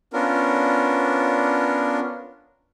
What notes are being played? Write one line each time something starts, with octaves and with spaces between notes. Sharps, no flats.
B3 C#4 D4 F4 A#4